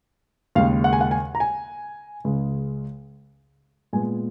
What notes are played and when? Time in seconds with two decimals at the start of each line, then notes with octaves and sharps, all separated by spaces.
0.55 D#2 C#3 G#3 F5
0.84 F#5
0.93 G#5
1.01 F#5
1.11 G#5
1.35 A#5
1.40 G#5
2.24 C#2 C#3 G#3
3.93 A#2 G#3 B3 G#5